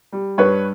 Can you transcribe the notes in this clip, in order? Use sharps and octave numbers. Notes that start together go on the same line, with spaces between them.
G3
G2 B4 C#5